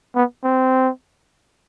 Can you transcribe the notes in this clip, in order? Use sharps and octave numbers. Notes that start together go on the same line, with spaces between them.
B3
C4